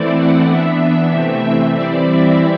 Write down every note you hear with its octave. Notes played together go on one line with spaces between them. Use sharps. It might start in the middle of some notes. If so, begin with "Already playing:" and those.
Already playing: E3 A3 C4 E4 D5
F#5
E3 B3 D4 E5
C3 E3 A3 C4
E3 G3 C4 E4 D5
E5